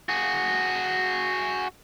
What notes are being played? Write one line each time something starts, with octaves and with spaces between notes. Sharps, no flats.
F#4 G#4